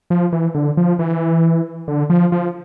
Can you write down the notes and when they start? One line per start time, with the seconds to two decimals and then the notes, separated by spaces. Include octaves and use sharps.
0.10 F3
0.33 E3
0.55 D3
0.77 F3
0.99 E3
1.88 D3
2.10 F3
2.32 F3